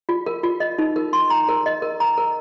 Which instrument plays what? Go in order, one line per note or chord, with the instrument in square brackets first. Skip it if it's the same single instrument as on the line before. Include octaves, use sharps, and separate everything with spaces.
[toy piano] F4
A#4
F4
D#5
D#4
A#4
C6
A#5
A#4
D#5
A#4
A#5
A#4